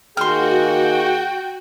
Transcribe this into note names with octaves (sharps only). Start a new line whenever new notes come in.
D#3 A#3 F#4 G#4 G5 C6 F6